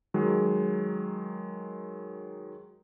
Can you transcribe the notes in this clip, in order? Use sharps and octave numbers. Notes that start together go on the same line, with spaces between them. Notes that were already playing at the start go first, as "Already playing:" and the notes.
D#3 F#3 G#3